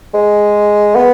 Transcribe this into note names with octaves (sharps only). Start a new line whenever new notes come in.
G#3
B3